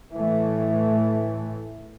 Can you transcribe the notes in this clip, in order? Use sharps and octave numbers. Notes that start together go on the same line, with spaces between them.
A2 E3 A3